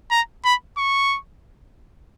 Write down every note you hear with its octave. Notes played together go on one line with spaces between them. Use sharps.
A#5
B5
C#6